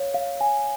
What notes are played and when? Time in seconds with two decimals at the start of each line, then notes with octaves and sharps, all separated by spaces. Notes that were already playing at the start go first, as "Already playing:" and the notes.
Already playing: C#5 F5
0.14 F5
0.41 G#5